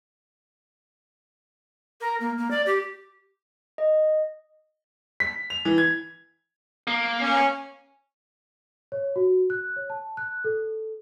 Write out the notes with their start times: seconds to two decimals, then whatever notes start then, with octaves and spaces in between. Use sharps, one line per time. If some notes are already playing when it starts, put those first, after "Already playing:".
2.01 A#4
2.20 A#3
2.38 A#3
2.51 D5
2.66 G4
3.78 D#5
5.20 B6
5.50 F7
5.65 E3
5.78 G#6
6.87 A#3
7.20 C#4
8.92 C#5
9.16 F#4
9.50 F#6
9.76 C#5
9.90 A5
10.17 F#6
10.44 A4